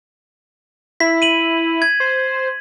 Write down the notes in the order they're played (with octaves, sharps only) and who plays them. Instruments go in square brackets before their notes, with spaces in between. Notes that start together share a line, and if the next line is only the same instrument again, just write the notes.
[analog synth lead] E4 [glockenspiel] B6
[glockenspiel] D#7 F#7
G#6
[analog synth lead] C5